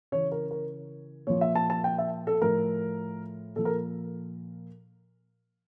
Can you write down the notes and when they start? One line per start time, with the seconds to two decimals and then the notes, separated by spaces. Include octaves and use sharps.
0.12 C#3 E3 C#5
0.32 A#4
0.51 A#4
1.27 A#2 F3 C#5
1.41 E5
1.55 A5
1.70 A5
1.84 G5
1.98 E5
2.27 A4
2.42 A2 F3 A#4
3.56 A#2 F3 A4
3.65 A#4